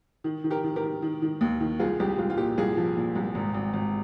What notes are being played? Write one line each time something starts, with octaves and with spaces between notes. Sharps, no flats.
D#3
D#3
G4 A#4
D#3
G4 A#4
D#3
D#3
D#3
D#2
D#3
C2 F4 G#4
C2 G4
C2 F4
F4
A#2 G4
C2 F4 G#4
F3
A#2
C2
G#1
G#1
G#1